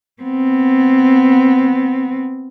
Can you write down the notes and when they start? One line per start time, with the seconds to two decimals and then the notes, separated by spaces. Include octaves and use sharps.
0.22 B3 C4